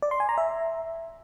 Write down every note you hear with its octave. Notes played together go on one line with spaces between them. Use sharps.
D5
C6
G#5
A#5
E5